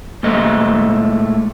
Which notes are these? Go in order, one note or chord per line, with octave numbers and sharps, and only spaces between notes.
A#2 G#3 A3 D#5